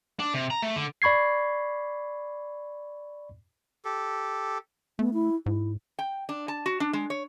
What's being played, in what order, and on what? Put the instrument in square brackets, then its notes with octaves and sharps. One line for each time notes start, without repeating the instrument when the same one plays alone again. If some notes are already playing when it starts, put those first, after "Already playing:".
[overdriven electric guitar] D4
C3
A#5
A3
D3
[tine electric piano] D5 B5 C#6 G#6 C7
[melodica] G4 A4
[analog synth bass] A3 [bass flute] B3
[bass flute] E4
[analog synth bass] G#2 [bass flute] E4
[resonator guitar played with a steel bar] G5
D4
A5
F#4
D4
G#3
C#5